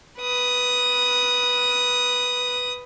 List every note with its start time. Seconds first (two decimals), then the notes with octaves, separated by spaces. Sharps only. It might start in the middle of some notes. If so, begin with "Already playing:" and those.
0.19 B4 D#6